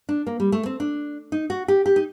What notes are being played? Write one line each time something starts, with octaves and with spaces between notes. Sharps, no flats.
D4
A#3
G3
A3
C4
D4
D#4
F#4
G4
G4
D#4